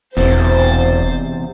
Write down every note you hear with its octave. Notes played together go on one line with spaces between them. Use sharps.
E1 E2 C3 C5 A6